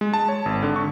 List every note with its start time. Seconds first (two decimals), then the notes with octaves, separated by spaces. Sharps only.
0.01 G#3
0.14 A5
0.29 C#5
0.46 G#1
0.63 D3
0.76 C#6